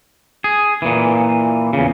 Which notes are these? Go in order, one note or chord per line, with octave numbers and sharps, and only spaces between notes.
G#4
A#2 E3
E2 C#3